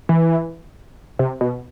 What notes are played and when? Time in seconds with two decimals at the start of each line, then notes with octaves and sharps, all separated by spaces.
0.09 E3
1.19 C3
1.41 B2